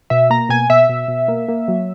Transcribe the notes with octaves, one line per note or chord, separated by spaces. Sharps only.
B2 E5
A#3 A#5
B2 G#5
B2 E5
B2
B2
A#3
A#3
F#3